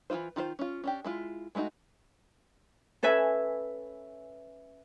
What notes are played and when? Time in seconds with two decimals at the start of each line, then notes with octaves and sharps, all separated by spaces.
0.10 E3 F#3 E4 F4 C5
0.36 D#3 F4 F#4 C5
0.59 C#4 F4
0.84 C#4 D4 G4
1.04 G#3 E4 F4
1.55 G#3 A3 B3 D#4 F#4
3.03 C#4 A4 B4 E5 G#5